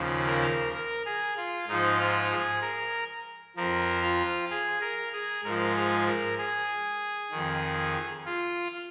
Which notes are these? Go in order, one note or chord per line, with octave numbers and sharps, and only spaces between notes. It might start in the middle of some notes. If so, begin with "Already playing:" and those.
Already playing: D#2 C#3 F3
A#4
A#4
G#4
F4
G#2 F3 D#4
F4
G#4
A#4
F2 F3 A#4
F4
G#4
A#4
G#4
G#2 F3 A#4
G#4
A#4
G#4
F2 D#3
F4